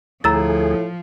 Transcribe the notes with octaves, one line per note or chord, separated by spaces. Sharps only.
D2 A2 F3 A3 G#4 A#5 E6 A6